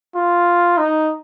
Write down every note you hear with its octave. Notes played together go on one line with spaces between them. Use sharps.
F4
D#4